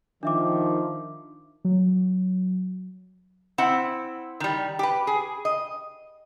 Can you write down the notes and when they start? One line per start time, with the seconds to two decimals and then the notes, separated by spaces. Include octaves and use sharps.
0.23 D#3 F3 D4 E5 D6
1.65 F#3
3.58 C4 E4 F#5
4.40 D#3 G3
4.79 G4 B4
5.07 G#4
5.45 D#5